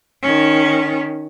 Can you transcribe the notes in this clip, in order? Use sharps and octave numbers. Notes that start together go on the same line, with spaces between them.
D#3 C#4